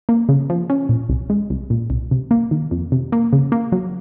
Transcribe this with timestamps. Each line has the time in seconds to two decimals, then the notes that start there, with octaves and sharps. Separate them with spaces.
0.09 A#3
0.29 C#3
0.50 F3
0.70 C#4
0.89 A#2
1.09 C2
1.30 G#3
1.50 C2
1.70 A#2
1.90 C2
2.11 C3
2.31 A#3
2.51 D#3
2.71 F2
2.92 C3
3.12 A#3
3.33 C#3
3.52 A#3
3.72 F#3